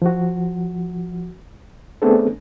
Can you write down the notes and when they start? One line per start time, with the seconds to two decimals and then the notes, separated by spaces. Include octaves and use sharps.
0.02 F3 F#4
2.02 A3 B3 C4 D4 G#4 A4